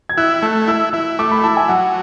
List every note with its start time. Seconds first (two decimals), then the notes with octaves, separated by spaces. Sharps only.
0.09 G#6
0.17 E4 F#6
0.42 A3
0.67 E4 E6
0.93 E4 E6
1.19 A3 D6
1.31 B5
1.44 E4 A5
1.57 G#5
1.68 F#3 F#5